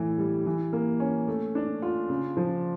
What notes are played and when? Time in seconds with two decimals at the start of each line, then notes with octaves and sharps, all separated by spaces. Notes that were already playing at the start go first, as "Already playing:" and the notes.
Already playing: A2 E3
0.18 G3
0.46 E3
0.73 A#3
1.00 C#4
1.28 A3
1.55 D4
1.82 F4
2.09 C#3
2.37 F3